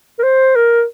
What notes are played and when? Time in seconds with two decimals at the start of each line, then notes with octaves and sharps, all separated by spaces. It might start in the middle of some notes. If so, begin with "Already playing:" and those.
0.19 A#4
0.23 C5
0.56 A#4